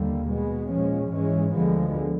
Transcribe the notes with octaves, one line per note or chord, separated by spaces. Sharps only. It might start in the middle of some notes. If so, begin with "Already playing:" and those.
Already playing: D#2 D3 G3 A#3
B2 G#3 B3
A#2 F3 G#3 C#4
G#2 E3 G#3 C#4
D2 D3 F3 G#3 B3